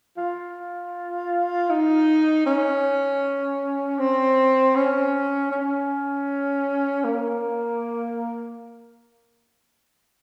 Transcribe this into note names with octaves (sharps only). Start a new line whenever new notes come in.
F4
D#4
C#4
C4
C#4
C#4
A#3